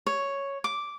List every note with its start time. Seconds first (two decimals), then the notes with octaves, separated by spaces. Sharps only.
0.06 C#5
0.64 D6